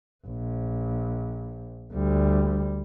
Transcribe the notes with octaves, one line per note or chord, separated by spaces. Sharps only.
A#1
D2 G3